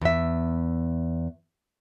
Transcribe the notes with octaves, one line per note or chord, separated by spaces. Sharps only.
E2 E5